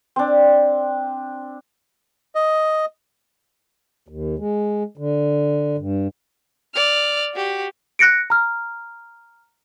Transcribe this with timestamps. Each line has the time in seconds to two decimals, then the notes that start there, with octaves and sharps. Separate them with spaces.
0.16 C4 D4
2.35 D#5
4.09 D#2
4.39 G#3
4.97 D3
5.78 G2
6.74 D5 F6
7.34 F#4 G4
7.99 F#6 A#6 C#7 D7
8.30 A#5 F6